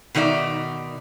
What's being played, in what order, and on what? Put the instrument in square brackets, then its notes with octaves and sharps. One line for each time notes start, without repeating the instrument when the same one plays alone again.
[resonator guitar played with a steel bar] B2 D#3 D#4 D5 E5